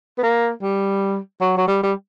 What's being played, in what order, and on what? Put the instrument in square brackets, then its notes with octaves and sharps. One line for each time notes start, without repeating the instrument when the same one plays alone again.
[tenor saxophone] B3
A#3
G3
F#3
F#3
G3
G3